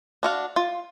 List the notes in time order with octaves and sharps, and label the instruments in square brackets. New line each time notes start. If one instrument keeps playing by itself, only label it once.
[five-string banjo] D4 F#4 F5
F4